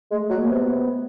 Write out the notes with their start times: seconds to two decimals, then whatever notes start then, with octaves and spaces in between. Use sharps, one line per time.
0.11 G#3 A3
0.24 A3
0.30 F#3
0.37 A#3
0.49 C3 B3